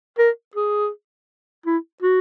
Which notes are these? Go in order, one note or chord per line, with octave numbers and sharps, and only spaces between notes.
A#4
G#4
E4
F#4